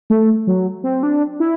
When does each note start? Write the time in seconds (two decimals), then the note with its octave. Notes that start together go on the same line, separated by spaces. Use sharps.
0.10 A3
0.47 F#3
0.84 C4
1.03 D4
1.40 E4